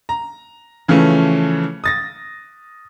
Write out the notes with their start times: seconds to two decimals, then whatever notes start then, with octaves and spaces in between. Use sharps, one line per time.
0.09 A#5
0.88 C#3 E3 F3 A3 C#4
1.84 D#6 A6 A#6